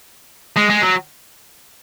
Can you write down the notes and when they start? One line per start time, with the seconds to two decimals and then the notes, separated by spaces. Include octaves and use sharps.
0.56 G#3
0.70 G#3
0.82 F#3